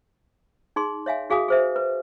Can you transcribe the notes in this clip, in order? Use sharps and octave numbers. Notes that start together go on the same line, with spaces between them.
D#4 G#4 C6
C#5 E5 F5 G#5
F#4 G#4 F5 G#5 D#6
G#4 C5 E5
B4